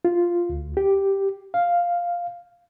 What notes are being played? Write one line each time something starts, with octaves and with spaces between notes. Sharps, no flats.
F4
D2
G4
F5